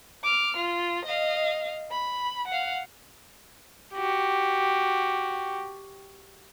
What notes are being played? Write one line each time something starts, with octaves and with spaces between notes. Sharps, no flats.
D6 F6
F4
D#5 F5
B5
F5 F#5
F#4 G4